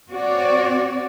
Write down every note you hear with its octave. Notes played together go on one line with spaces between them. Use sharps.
C4 F#4 C#5 D5